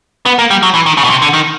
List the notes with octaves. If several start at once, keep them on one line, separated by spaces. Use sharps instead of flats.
B3
A#3
G3
F#3
E3
D#3
C#3
B2
C3
D3
D#3